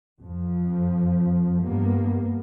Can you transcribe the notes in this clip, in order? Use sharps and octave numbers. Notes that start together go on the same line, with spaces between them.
F2 F3
G2 A#3 B3